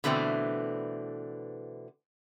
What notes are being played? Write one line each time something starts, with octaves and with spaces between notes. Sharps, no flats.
B2 D3 E3 A3 C4